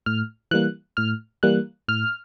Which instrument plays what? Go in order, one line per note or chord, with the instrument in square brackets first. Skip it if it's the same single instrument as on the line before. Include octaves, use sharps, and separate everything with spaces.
[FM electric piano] A2 F6
E3 G3 A#3 F#6
A2 F6
E3 G3 A#3 F#6
A2 F6